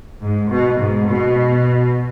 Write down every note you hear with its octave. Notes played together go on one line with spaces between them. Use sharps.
G#2
B2
G#2
B2